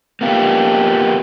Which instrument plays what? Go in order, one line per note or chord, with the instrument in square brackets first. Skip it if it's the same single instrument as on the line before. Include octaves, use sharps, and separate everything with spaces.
[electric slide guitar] A#3 B3 F4 G4